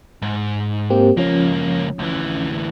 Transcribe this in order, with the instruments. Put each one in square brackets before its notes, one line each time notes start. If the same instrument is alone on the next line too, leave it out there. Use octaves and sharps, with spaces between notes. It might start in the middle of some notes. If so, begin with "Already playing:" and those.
[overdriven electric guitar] G#2
[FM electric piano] A#3 C4 G4
[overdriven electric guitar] C#2 A#3 [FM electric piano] F3 C#4
[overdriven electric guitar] D2 E3